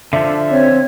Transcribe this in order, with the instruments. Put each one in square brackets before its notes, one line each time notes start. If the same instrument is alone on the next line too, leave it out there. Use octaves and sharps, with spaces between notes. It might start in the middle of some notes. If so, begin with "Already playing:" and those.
[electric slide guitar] D3 F3 [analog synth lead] E5
[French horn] C4 [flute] C#5